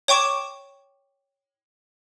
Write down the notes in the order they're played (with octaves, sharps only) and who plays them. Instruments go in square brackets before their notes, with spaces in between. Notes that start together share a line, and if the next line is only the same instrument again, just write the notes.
[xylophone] C#5 G5 C#6 D6 E7